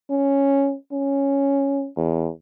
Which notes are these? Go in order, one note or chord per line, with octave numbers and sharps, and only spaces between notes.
C#4
C#4
E2